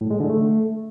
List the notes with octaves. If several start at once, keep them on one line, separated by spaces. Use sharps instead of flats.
A2
G#3
D3
A3